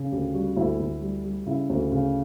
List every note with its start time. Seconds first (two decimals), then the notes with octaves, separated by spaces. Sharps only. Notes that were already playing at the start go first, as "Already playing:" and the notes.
Already playing: C#3
0.11 D2 G4
0.34 G3 F#4
0.56 D2 E4
0.80 D2
1.01 G3
1.24 G3
1.46 C#3 E4
1.69 D2
1.92 C#3